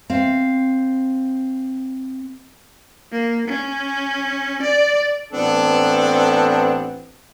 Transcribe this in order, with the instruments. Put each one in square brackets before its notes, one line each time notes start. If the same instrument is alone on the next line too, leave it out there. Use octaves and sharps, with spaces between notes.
[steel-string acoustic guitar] C4 F5
[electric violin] A#3
C#4
D5
[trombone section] A1 B3 C4 [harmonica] D4 A4